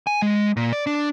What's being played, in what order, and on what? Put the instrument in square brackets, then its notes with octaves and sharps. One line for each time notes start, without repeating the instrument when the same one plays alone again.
[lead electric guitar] G#5
G#3
A#2
D5
D4